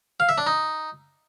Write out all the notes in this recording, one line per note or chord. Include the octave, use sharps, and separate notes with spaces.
F5
E5
D4
D#4